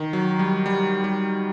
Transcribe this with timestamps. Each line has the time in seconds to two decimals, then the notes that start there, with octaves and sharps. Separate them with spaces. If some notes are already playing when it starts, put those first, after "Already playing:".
Already playing: D#3
0.13 F#3
0.39 G3
0.66 G3
1.04 G3